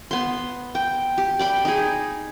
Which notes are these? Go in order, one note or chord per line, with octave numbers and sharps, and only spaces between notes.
B3 C6
G5
G4
D5 G5 B5
D#4 G#4